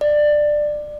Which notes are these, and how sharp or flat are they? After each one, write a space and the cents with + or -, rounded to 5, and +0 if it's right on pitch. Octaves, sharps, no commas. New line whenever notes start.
D5 +15